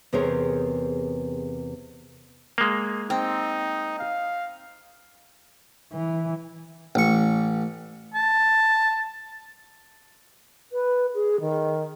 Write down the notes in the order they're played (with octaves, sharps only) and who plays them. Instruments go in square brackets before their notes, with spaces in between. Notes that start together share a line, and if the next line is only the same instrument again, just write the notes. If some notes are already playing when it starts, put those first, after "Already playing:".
[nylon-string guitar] E2 C3 G#4 A#4 C5 C#5
[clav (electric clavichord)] G#3 A#3
[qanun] C4 [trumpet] D#4
[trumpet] F5
[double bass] E3
[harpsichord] A1 C#6
[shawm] A5
[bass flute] B4
G#4
D#3